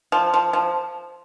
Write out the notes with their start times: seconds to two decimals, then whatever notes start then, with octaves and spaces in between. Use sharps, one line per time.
0.12 F3
0.34 F3
0.53 F3